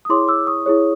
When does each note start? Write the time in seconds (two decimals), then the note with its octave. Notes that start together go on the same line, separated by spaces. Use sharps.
0.05 D#6
0.09 E4 G#4 C#5 C6 D6
0.28 D6 E6
0.47 C#6 D#6
0.66 E4 G#4 C#5